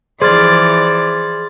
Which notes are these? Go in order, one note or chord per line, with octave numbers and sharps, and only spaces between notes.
E3 F3 G#4 C5 D5 C6 F6 A6